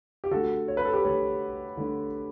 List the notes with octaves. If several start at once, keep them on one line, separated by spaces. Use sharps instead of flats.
G4
D3 A3 F#4 A4
C#5
B4
A4
G4 B4
D3 A3 A4 C#5
D3 A3